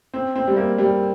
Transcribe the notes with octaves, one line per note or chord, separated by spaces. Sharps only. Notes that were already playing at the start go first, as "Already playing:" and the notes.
C4
C4
G3
A#3
G3